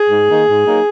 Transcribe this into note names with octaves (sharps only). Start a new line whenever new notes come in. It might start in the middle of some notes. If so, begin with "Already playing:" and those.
Already playing: G#4
G#2
D#3 A#3 D#4
G#2
F#3 A#3 D#4